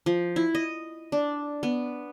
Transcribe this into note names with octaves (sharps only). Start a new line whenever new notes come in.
F3
E4
D#5
D4
B3